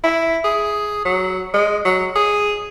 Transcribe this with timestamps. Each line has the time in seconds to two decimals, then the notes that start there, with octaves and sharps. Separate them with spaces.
0.04 E4
0.44 G#4
1.05 F#3
1.54 G#3
1.85 F#3
2.16 G#4